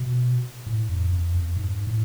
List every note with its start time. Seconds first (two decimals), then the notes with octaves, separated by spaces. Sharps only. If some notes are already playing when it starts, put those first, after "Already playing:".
Already playing: B2
0.66 A2
0.89 F2
1.11 F2
1.35 F2
1.57 G#2
1.87 A2